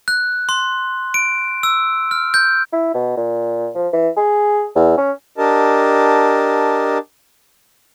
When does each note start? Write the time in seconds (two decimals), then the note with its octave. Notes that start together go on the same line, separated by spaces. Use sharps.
0.08 F#6
0.49 C6
1.14 D7
1.63 E6
2.11 F6
2.34 G6
2.72 E4
2.94 B2
3.17 A#2
3.75 F3
3.93 E3
4.17 G#4
4.75 E2
4.98 C#4
5.38 D4 G4 A#4 D#5 A5